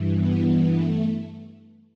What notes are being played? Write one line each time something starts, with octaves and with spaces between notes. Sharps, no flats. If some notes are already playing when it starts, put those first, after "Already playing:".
Already playing: G2 E3
B3
B3
A3